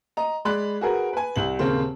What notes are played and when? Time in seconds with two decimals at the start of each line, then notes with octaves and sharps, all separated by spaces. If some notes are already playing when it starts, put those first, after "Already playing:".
0.17 D#5 A#5
0.45 G#3 D5 B5 F#6
0.81 F#4 G#4 A#4 B4
1.13 B4 G#5
1.36 C2 F#7
1.59 D#1 C#3 A#3 C4 C5